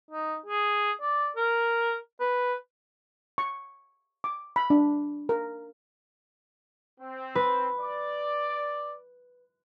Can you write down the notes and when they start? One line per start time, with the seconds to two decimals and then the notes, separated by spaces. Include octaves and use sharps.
0.11 D#4
0.46 G#4
1.01 D5
1.36 A#4
2.20 B4
3.38 C#6
4.24 D6
4.56 B5
4.70 D4
5.29 A#4
6.99 C4
7.35 B4
7.78 D5